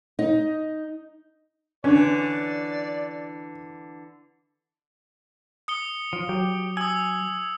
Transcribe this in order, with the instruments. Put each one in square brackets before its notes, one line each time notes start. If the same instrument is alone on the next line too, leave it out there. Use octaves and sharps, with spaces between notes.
[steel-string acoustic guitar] D#4
[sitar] D3 E3 [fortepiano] C#4 [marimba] D4 [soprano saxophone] D5
[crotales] D#6 C#7 G7
[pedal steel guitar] F3
[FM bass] F#3 [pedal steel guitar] G4
[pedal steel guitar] G#5 [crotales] D#6 E6